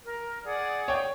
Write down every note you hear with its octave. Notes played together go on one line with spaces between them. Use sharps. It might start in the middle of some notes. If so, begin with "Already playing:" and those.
A#4
G#4 D5 F#5
C#5 G5